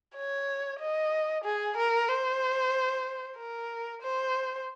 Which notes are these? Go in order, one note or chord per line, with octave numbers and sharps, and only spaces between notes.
C#5
D#5
G#4
A#4
C5
A#4
C5